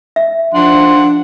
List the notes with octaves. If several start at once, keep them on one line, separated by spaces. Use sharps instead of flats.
E5
F3 D4 F#5 C6